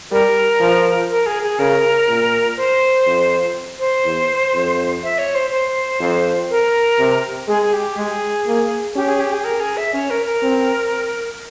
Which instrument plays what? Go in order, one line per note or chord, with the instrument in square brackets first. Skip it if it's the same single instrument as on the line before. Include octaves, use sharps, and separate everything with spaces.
[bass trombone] G3 [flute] A#4
[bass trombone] F3
[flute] A#4
G#4
G#4
[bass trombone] C#3 [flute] A#4
[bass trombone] A#2
[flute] C5
[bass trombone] F2
[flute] C5
[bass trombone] E2
F2
[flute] E5
C#5
C5
C5
[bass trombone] F2
[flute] A#4
[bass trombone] C3
[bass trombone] G#3 [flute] G#4
[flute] G#4
G4
[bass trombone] G#3 [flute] G#4
[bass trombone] A#3
[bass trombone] C#4 [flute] G4
[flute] G#4
G4
G#4
A#4
G#4
E5
[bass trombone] C#4 [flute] C#5
[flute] A#4
A#4
[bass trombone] C4